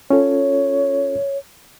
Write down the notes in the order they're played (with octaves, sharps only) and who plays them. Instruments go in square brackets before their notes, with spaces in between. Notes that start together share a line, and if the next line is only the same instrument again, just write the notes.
[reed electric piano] C#4 F4 A4 [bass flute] C#5